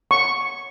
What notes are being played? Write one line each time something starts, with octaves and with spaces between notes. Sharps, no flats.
C#6